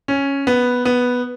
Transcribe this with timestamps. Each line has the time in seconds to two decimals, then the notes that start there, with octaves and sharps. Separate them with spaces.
0.08 C#4
0.47 B3
0.85 B3